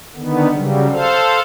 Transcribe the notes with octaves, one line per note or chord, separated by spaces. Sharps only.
D3 D#3 B3
C#3 F#3 G3
A4 C5 F5